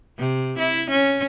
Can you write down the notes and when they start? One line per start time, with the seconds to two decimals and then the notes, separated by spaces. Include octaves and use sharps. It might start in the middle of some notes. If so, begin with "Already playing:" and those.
0.19 C3
0.59 E4
0.91 C#4